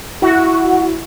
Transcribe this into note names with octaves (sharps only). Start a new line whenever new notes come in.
E4 F#4